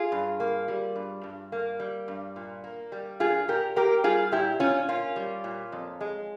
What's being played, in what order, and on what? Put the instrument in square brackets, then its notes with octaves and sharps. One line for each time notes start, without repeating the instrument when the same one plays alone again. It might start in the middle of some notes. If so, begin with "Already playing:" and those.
Already playing: [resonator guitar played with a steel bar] F4 G#4
G2
A#3
G3
G2
G2
A#3
G3
G2
A#2
A#3
G3
A#2 F4 G#4
A#2 G4 A#4
A#3 G4 A#4
G3 F4 G#4
A#2 E4 G4
A#2 C#4 F4
A#3 C#4 F4
G3
A#2
F2
G#3